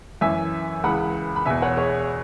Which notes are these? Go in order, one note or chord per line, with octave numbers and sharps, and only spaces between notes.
F#2 E3 E5 G#5
C#2 C#3 E3 F#5 B5
B5
E2 B2 E5 G#5
C#5 F#5
G#4 C#5